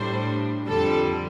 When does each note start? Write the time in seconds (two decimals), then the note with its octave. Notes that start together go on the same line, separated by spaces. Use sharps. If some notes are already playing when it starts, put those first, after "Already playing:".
Already playing: A2 G3 D4 C5
0.66 F2 D3 G3 A4